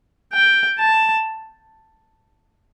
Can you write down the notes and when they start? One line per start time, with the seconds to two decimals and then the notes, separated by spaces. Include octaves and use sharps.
0.33 G5
0.79 A5